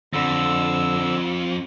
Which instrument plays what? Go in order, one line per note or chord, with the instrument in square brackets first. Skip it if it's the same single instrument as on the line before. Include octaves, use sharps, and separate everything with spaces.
[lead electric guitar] F2 [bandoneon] D3 E6